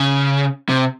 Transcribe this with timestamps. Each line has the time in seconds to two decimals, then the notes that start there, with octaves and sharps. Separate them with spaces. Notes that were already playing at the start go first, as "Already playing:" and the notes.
Already playing: C#3
0.69 C3